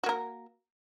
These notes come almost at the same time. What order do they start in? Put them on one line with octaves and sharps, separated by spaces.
F#4 A#3 A#4